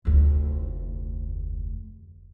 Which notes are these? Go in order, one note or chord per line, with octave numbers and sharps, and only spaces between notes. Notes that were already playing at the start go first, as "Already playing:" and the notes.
F1 D2